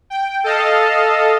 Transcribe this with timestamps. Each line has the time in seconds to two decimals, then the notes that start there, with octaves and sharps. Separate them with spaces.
0.10 G5
0.44 A4 D#5 F5 A5